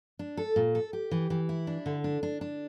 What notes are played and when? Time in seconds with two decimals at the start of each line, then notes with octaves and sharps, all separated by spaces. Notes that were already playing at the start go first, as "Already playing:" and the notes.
0.19 D4
0.37 A4
0.56 A#2
0.75 A4
0.93 G4
1.11 E3
1.30 E3
1.49 E4
1.67 D4
1.86 D3
2.04 D4
2.23 D4
2.41 D4